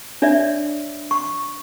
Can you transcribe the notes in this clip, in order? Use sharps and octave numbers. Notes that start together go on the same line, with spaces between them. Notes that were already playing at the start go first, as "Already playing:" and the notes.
D4 C#5 D5 E5
C#6